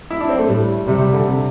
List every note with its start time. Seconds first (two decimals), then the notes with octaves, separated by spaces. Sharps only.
0.11 E4
0.20 D4
0.29 C4
0.39 A3
0.48 A2 G3
0.87 C3 G3
1.00 G3
1.13 D3
1.25 C3